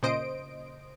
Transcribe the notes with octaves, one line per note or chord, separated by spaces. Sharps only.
A#2 C#3 C5 D#5 D7